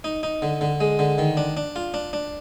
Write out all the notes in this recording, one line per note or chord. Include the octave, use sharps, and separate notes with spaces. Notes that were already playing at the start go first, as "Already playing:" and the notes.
D#4
D#4
D3
D3
G#3
D3
D#3
D4
D4
F4
D4
D4